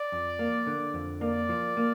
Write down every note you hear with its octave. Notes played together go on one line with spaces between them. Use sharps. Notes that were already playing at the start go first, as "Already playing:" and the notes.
Already playing: D5
F2
A#3
D3
F2
A#3 D5
F3
A#3